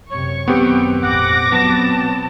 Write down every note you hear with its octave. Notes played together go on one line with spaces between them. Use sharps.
F#2 C3 C#5 C#6
F#2 D#3 F#3 B3 C4 G4 G5
G#1 F2 A#2 F#5 D6 A#6
B2 F#3 B3 C4 A5